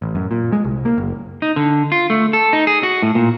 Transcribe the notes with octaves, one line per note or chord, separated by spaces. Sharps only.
A1
F#2
A#2
G#3
C2
A#3
F#1
D#4
D3
F4
A3
A4
D#4
G#4
F#4
A2
A#2